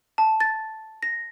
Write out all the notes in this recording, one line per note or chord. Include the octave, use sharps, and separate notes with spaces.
A5
A6
A#6